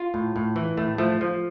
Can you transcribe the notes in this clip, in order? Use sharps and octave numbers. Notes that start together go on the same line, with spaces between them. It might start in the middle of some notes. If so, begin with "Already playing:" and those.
Already playing: F4
A2
A2
E3
A2 A3
F3 A3
F3